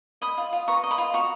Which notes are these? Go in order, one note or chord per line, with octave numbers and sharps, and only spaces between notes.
D#5 B5 D#6
F4
F4
B4 A#5 C#6
D#5
B5 D#6
F4
F#4 A#5 C#6